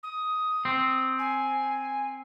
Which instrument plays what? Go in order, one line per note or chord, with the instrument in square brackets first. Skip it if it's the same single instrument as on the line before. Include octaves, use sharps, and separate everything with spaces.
[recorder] D#6
[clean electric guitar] C4
[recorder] G#5